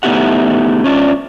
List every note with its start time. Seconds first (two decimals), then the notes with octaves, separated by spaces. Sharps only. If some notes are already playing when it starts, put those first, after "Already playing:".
0.03 A3 B3 D#4 E4 G4 F#5
0.84 C#4 D4 F4 D5